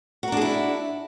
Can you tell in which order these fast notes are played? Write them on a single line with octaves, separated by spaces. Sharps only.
F#4 A#4 D4 G#4 E4